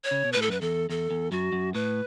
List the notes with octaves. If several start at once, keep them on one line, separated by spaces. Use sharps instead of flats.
C#5
C#3
B2
A2 B4
A4
F#2 B4
E2 A4
E2 A4
E2
F#2 F#4
F#2
A2 B4